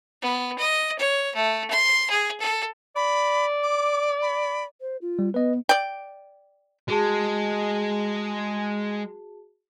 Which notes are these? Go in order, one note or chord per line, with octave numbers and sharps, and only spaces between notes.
B3
D#5
C#5
A3
C6
G#4
A4
D5 B5
D6
B5
C5
F4
G3
B3 B4 D#5
D5 G5
G#3 F#4 G#4 A5